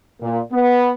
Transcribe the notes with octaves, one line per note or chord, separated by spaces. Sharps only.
A#2
B3